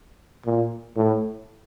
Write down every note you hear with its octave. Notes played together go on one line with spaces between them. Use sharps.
A#2
A2